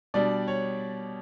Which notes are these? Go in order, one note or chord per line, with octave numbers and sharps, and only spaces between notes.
B2 G3 D4 D5
C#5